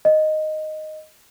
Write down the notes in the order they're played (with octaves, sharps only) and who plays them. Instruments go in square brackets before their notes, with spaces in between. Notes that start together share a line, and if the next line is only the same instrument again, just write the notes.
[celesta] D#5